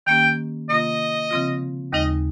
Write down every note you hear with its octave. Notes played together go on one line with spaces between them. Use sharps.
D#3 A#3 C#4 G4 G5
C3 D#3 A#3 F4 D#5
C#3 F3 C4 F4
D#2 C#3 G#3 D#4 D#5